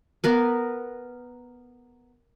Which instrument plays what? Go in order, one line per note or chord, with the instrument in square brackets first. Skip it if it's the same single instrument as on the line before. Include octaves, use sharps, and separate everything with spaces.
[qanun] B3 A#4 B4